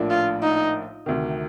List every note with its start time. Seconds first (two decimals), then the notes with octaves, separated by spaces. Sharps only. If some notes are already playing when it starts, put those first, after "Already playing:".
Already playing: A#1 A2 F3 A#3 D4
0.10 F4
0.42 D#4
1.06 D2 C3 D#3